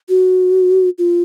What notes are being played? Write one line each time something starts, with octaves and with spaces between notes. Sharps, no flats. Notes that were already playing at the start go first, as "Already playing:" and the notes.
F#4
F4